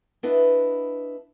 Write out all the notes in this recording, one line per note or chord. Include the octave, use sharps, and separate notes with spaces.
B3 D4 E4 B4 D#5